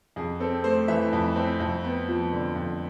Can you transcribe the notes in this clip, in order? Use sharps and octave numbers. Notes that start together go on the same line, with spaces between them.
F2 G#4
C4 A4
A3 C5
E3 E5
F2
C4
F2
B3
F3
D3
F2